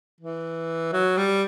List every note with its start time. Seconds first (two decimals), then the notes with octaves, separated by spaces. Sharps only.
0.20 E3
0.93 F#3
1.18 G3